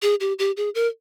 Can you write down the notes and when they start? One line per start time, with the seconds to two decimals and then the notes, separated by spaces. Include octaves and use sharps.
0.02 G#4
0.20 G4
0.39 G4
0.57 G#4
0.75 A#4